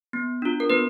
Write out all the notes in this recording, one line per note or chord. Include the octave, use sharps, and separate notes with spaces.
B3
D4 F4
A#4
B3 B4